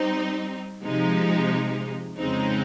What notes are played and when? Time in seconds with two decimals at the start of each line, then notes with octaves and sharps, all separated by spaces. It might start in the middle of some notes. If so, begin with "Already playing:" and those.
Already playing: G3 C4 D#4
0.84 C3 F3 G#3 D#4
2.17 F2 C#3 G#3 C4 D#4